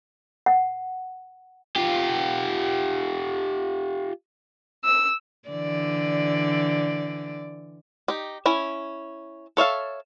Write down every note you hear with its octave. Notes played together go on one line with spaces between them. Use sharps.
F#5
F4 G4
E6
D3 E3 D5
D#4 G4
C#4 E4 G#5
A4 C#5 E5 F5